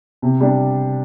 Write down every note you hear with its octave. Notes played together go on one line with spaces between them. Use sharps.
C3
G3 D4